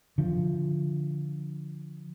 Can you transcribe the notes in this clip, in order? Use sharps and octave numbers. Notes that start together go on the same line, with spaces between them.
D3 F3